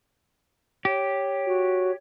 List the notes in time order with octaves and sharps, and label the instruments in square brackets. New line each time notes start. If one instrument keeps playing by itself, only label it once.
[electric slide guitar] G4 [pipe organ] C#5
[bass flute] F#4